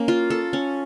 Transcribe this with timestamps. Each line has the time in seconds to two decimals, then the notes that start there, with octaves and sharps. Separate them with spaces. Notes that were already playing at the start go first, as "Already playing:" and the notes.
Already playing: A#3 C#4
0.08 F4
0.30 A4
0.53 C#4